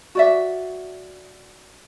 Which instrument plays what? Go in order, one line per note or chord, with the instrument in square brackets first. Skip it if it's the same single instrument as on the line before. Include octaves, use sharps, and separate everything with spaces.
[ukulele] F#4 D5 E5